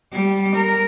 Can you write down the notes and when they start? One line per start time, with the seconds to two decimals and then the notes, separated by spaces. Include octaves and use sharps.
0.13 G3
0.55 A#4